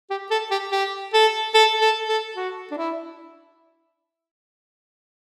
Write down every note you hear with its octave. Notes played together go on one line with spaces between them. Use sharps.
G4
A4
G4
G4
A4
A4
A4
A4
F#4
D4
E4